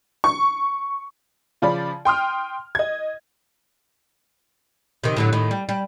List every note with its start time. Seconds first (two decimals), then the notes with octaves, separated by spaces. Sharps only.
0.24 C#6
1.62 C#3 F3 C#4 D5 B5
2.05 G5 C6 D#6 F6
2.75 D#5 G#6
5.04 C3 D#3
5.16 A2 D3 F#3
5.33 A2 D#3
5.51 G3
5.69 G3